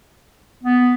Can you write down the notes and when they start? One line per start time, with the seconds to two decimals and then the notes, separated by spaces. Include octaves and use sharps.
0.64 B3